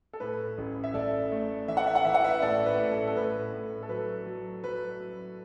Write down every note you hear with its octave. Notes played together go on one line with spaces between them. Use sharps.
A4
A2 B4
A1
E5
A1 A4 D5
A3
E3 E5
F#5
E5
F#5
E3 E5
F#5
B4 E5
A2 A4 D5
B4
A2
A4
A4
A2 B4
A2
A4
F#3 B4
F#3
F#3 B4
F#3